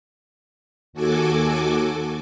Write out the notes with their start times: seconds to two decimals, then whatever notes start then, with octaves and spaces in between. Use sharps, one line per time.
0.93 D#2 F#4 A4 G#5 D6